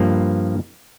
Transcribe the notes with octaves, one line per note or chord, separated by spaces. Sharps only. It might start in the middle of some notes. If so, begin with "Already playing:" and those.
Already playing: G2 F3 A#3